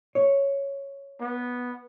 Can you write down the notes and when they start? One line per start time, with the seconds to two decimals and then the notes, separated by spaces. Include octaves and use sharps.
0.15 C#5
1.20 B3